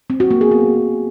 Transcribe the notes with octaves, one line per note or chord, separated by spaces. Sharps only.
C4
F#4
A#3
G#4
B3